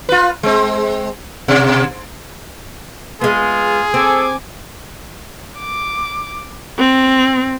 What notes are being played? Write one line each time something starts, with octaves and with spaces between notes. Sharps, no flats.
F4 B4
G#3 C4
B2
G#3 B3 F4 G#4
C4 A4 G#5 D6
D6
C4